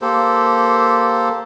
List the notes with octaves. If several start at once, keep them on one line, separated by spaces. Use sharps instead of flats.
A#3 G4 A4 C5